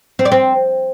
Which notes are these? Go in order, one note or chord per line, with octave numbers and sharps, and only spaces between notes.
C4
D5
C4